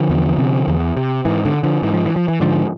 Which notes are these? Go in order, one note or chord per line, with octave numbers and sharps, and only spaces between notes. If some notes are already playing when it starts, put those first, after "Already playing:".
Already playing: D3 F3
E2
C3
E2
C3
G#2 E3
D3
D3 F3
G#2 E3
F3
E3
F3
E3
G#2 D3 F3